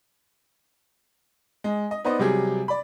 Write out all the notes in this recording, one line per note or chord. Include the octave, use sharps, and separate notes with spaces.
G#3
D#5
B3 D#4 B4 C5 D5 D#5
C3 F#3 G3 G4 G#4
D5 B5